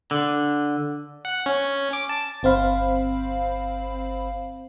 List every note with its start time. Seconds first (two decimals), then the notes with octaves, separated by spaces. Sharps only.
0.11 D3
1.25 F#5
1.46 C#4
1.93 D6
2.09 A5
2.43 G1 C4 C5 F5 B5